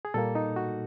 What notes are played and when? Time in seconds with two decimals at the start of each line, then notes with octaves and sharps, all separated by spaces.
0.05 G#4
0.14 A#2 G3 A#3 A4
0.35 D#4
0.56 F#4